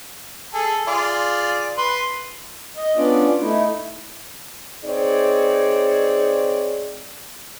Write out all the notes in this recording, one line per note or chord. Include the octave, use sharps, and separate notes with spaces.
G#4 A4
F4 G#4 D5
B4 C6
D#5
B3 C#4 D4 F4 D5
A3 D#4 E4
C4 D#4 G#4 C#5 D5